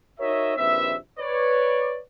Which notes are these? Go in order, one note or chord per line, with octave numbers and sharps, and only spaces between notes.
D#4 F#4 A#4 C#5 D#5 E5
A#1 D#2 C4 B4 E5
B4 C#5 D5